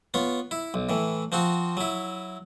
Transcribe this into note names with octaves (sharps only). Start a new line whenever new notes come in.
B3 F4 C#5
E4
B1
A2 E3
F3 C4 F#4
F#3 E4